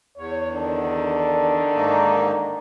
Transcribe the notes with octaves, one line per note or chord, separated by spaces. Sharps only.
E2 C#5
D3 D#3 D4
G#2 A#3 D#4